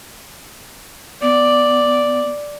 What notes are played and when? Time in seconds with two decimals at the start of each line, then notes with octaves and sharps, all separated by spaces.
1.22 B3 D5